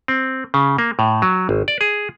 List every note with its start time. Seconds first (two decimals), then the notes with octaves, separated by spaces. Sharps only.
0.08 C4
0.54 C#3
0.79 A#3
0.99 A2
1.22 F#3
1.49 G#1
1.68 D5
1.81 G#4